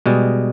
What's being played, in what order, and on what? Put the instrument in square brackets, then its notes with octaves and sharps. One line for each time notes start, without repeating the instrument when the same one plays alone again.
[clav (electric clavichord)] B2 G3 G#3